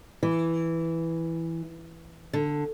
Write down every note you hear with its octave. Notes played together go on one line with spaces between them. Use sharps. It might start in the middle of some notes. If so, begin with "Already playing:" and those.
E3
D3